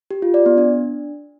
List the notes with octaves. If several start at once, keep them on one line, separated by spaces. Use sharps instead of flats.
G4
F4
D5
B3
D4